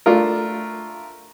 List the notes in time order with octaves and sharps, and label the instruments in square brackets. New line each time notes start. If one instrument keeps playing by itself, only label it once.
[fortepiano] A3 D4 F4 A#4